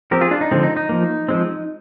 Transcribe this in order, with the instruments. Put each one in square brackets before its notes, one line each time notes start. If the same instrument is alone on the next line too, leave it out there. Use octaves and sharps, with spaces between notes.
[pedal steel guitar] F3 C4 G4 A#4
F4 G#4
D4 F4
D#4
D3 F3 G#3 C4
D#4
D#4
F3 A#3
F3 G#3 C4